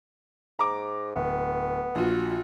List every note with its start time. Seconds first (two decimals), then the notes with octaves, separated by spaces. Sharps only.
0.59 G#2 A#5 D6
1.16 D1 B3
1.95 A#1 F4 F#4